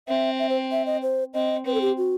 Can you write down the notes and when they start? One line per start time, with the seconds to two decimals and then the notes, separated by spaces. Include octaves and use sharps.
0.08 C4 E5
0.39 E5
0.49 C5
0.72 E5
0.86 D#5
1.02 C5
1.34 C4 D#5
1.66 C4 B4
1.74 A4
1.81 G4
1.97 F#4